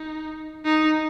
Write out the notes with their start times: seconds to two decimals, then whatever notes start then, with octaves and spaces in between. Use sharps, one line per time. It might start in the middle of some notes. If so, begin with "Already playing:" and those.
Already playing: D#4
0.65 D#4